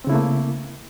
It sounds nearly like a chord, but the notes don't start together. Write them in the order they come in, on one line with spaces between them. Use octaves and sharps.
C4 C#3 E4 A3 A#3